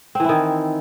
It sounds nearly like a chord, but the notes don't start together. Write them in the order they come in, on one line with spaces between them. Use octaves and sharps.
C4 E3 E4 D#3